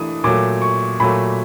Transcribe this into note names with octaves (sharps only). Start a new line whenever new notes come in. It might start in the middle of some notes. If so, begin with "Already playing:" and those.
Already playing: E3 A3 D4 D#6
A#2 F#3 A3 D6
C#6
A#2 F#3 A3 B5